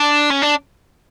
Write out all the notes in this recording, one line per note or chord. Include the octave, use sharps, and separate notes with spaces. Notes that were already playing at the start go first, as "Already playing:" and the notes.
Already playing: D4
C#4
D4